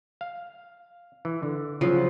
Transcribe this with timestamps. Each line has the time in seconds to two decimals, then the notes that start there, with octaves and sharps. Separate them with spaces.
0.21 F5
1.25 E3
1.43 D3
1.81 C#3 F3 F#3